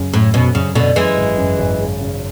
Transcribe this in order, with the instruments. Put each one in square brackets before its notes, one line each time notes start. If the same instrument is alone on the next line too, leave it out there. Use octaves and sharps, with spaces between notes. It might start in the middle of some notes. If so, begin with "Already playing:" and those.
Already playing: [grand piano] F#2 C#3
[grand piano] F#2 [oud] A2
[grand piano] F#2 [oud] B2
[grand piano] F#2 [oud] C#3
[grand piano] F#2 [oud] B2 D3
[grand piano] F#2 [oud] E3 G#3
[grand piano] G#1
F#2
G#1
C#3
C#3